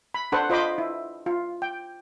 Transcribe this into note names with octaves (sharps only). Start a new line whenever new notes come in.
B5
D4 A4 B4 C5 F#5
F4 C5 D#5 B5 D6
E4
F4
G5